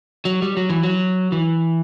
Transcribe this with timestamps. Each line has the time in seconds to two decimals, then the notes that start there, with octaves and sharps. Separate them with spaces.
0.25 F#3
0.42 G3
0.57 F#3
0.70 E3
0.83 F#3
1.32 E3